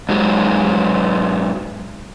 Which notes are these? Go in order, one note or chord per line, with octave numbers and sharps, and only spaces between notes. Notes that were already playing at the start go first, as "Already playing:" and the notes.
G#2 F#3 G#3